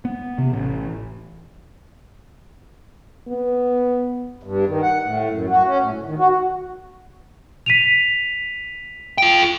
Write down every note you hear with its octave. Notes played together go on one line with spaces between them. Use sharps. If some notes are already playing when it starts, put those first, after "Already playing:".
B3
C3
A1
B3
G2
D#3
F#5
A2
F#2
F#4
C#4
A2
D2
D#3
F#4
B6 D#7 F7
F4 G5